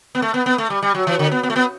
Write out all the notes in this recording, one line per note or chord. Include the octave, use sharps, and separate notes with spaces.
B3
A3
B3
B3
A3
G3
G3
F#3
E3
D3
B3
B3
A3
B3